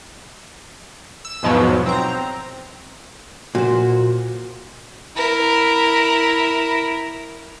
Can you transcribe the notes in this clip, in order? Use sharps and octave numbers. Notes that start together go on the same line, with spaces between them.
E6
E2 G#2 B2 F3 F#3
C4 A#5
A#2 F#4 C5
E4 A#4